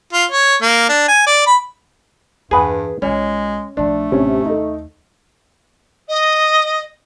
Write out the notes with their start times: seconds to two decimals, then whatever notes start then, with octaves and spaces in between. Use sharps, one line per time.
0.13 F4
0.31 C#5
0.62 A#3
0.89 D4
1.08 G#5
1.27 D5
1.47 B5
2.51 E2 G2 G#4 B4 F#5
3.02 B1 G#3 C#4 F4
3.77 B1 F3 A3 D4
4.12 A1 C3 C#4
4.45 D#2 D#4 A4
6.08 D#5